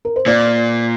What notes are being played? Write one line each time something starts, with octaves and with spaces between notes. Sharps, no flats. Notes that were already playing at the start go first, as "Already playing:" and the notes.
A#4
C5
A#2 D5